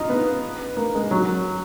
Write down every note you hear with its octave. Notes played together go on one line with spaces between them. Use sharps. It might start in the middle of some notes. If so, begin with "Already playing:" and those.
Already playing: D#4 F4
B3
A#3
G#3
F#3